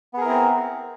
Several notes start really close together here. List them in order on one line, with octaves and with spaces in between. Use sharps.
B3 G#4 A#4 E4 C4